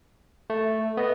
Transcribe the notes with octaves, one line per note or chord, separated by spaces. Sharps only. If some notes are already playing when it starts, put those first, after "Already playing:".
A3
B3 D#5